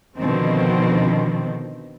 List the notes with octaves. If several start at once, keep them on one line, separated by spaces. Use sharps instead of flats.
B2 D3 D#3 F3 C4